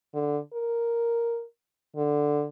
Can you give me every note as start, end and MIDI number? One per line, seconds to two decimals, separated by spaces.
0.14 0.38 50
0.53 1.44 70
1.96 2.45 50